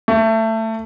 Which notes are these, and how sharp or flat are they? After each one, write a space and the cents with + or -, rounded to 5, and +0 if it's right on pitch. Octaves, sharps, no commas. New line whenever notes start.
A3 +20